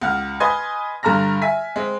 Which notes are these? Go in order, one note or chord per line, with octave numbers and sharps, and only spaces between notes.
C#2 F#5 F6
B4 D#5 G#5 C6 G#6
G2 D3 A#5 F6 A#6
E5 G#5 B6
G#3 C4